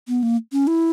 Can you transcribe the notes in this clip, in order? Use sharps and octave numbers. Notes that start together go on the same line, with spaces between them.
B3
A#3
C#4
E4